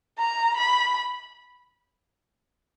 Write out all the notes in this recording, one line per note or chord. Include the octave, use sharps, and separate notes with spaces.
A#5
B5